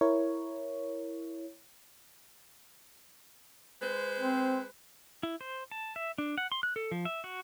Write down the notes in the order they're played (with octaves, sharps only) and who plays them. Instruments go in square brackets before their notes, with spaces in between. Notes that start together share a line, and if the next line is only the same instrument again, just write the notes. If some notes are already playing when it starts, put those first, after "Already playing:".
[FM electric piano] E4 A#4 C#5
[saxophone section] G#3 B4 C5
[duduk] C4
[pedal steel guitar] E4
C5
A5
E5
D4
F#5
C6
F#6
A4
F3
E5
F#4